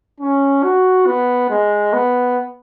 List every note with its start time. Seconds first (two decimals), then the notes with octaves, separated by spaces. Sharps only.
0.20 C#4
0.63 F#4
1.06 B3
1.50 G#3
1.93 B3